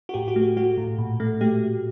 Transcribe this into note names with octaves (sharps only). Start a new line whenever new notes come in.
F#4
A2 G4
F#4
A3
G4
A3 F#4
A2
A#2
A3
A3 G4